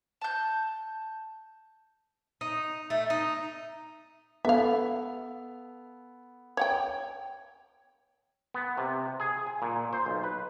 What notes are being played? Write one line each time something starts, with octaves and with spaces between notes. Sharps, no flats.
A5 G6
D#4
A3
D#4
B3 A4 E5 F5
C#5 F#5 G5
B3
C3
G#4
G#5
A#2
C5
B1
B4